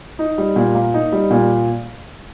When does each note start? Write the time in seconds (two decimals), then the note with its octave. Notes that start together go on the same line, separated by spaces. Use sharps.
0.19 D#4
0.38 G3
0.56 A#2
0.75 A#3
0.94 D#4
1.12 G3
1.31 A#2